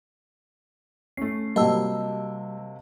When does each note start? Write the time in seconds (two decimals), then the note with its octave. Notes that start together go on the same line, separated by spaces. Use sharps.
1.17 A3 C#4 C7
1.56 C3 F#3 G3 A#3 D#5 A5 E6